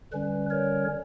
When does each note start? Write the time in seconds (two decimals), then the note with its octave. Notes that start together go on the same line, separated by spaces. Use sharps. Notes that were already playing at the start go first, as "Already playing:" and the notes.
0.12 D3 G3 C#4 B4
0.50 A#4 C#5